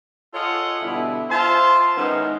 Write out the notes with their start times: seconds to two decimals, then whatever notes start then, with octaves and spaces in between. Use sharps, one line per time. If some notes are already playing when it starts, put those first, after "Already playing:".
0.33 F4 G#4 A4 C#5 D#5 F#5
0.82 B2 D3 G3 E4
1.30 F4 C5 E5 A5 C6
1.97 D#3 G#3 B3 C#4 D#4 E4